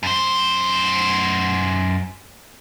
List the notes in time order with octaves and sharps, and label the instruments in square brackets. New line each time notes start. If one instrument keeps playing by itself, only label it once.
[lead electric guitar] F#2 C5